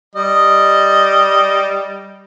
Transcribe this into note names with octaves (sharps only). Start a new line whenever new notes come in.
G3 D#5